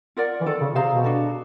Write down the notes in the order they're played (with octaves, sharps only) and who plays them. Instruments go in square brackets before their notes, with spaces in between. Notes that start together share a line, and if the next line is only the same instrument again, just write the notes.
[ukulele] F4 A#4 D5 F#5
[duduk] E3
[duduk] D#3 [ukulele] F4 A4 D5
[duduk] C#3
[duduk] C3 [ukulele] G#4 C5 F5 A#5
[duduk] B2
[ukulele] D4 F#4 A4